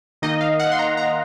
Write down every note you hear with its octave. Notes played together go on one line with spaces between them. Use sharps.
D#3 A#3 D#4 D#5
F5
F#5
C6
A#5
A#5